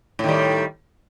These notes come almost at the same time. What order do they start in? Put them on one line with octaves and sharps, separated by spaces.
A2 D#3 G3